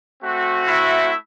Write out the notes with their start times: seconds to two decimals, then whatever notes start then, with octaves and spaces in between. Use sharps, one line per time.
0.23 A3 C4 F#4
0.68 E4 E5